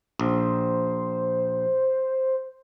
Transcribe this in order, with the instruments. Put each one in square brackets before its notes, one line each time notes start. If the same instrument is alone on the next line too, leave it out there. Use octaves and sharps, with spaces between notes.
[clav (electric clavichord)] A#1 [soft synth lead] C5